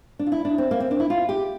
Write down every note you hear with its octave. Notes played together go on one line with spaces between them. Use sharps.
D4
F4
E4
D4
C4
A#3
C4
D4
E4
F4
G4